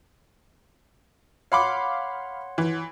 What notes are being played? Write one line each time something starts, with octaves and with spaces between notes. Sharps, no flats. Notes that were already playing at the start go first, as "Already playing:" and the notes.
C#5 F5 F#5 B5 C6 D6
E3